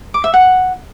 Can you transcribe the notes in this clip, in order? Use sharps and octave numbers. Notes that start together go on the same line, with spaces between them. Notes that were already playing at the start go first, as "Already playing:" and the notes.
D6
E5
F#5